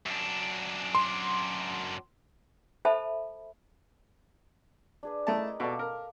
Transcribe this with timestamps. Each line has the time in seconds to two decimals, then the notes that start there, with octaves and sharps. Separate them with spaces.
0.06 F#2 D4
0.95 C6
2.85 A4 C5 E5 A5 B5
5.03 D4 G#4 B4
5.27 A3 E4 A#4 B4 D#5 A5
5.60 B2 A4 D5 F5 D6
5.79 A#4